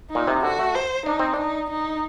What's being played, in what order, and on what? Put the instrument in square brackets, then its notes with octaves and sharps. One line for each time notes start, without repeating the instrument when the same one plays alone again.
[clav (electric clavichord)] A#2 [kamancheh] D#4
[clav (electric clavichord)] C3
[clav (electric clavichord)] D3 [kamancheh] F#4
[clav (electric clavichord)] A3
[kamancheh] C5
[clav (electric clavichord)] D4 [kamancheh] D#4
[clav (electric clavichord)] C4
D4
[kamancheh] D#4
D#4